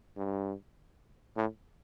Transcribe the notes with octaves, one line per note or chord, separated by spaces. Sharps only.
G2
A2